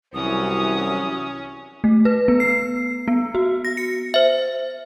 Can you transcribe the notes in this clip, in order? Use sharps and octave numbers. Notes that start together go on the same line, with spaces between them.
C2 E3 F#3 C#4 D#6
A3
B4
B3
C7
B3
F#4
A#6
C#7
C5 E5